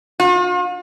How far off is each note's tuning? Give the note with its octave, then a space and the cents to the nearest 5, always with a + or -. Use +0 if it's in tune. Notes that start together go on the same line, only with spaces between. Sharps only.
F4 +45